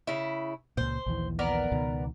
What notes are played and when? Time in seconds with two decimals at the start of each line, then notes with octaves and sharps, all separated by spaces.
0.07 C#3 E4
0.77 C#2 A#2 C5
1.06 A#1 D#2 E3
1.39 B3 A#4 D5
1.71 C#2 B2 D#3